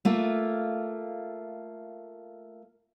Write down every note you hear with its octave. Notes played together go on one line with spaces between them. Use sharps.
A3 A#3 F4